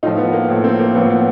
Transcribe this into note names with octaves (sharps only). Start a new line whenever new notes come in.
A2 F3 D#4 F4
B3
A#3
A2 F3
A#3 C4
A#3
A2 F3 B3
B3